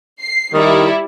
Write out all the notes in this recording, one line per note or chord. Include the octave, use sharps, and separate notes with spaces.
C7
D#3 G3 E4